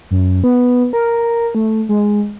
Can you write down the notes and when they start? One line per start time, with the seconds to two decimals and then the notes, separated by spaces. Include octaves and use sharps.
0.11 F#2
0.44 B3
0.93 A#4
1.55 A3
1.89 G#3